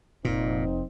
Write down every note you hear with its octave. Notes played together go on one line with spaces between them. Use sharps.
F1 A#2 C4 D#4